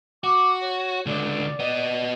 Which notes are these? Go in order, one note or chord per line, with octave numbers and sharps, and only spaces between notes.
F#4 D6
C#5
C#2 D3 D5
B3 D#5